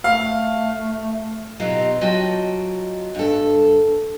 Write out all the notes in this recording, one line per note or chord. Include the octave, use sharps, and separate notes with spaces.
A3 F5
B2 F#3 C4 D#4 F4 G4
F#3 F4 F#4 D#5 G5 A5
G2 A4